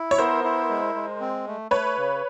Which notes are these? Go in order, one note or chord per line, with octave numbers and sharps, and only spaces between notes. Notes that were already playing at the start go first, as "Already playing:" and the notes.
Already playing: E4
C#5
B3 A#4 C5
E4
G#3
G#3
C4
A3
A3 B4 C#5
C#3